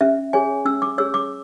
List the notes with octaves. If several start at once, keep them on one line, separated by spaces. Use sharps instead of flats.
C#4 E5
G#4 C#5 G#5
C#4 E6
D6
G#4 C#5 E6
D6